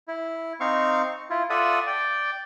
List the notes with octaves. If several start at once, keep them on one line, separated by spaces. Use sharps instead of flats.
E4
C4 D#4 F5 C#6
E4 F4
F4 A4 D5 E5 F#5 D#6
D5 G5